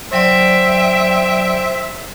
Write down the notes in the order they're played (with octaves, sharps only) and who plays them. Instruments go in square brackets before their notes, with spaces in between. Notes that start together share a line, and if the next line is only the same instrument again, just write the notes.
[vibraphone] F#3 D5 [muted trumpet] C5 [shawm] E5 [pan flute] G5